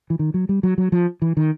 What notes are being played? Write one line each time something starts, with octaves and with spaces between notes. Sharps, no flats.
E3
D#3
F#3
G3
F#3
F#3
F3
E3
D#3